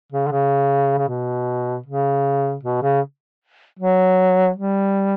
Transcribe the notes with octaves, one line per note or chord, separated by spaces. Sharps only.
C#3
D3
C#3
C#3
B2
C#3
B2
C#3
F#3
G3